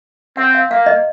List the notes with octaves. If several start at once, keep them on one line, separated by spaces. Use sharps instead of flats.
C4 F#5
F5
A#3 F5
D#5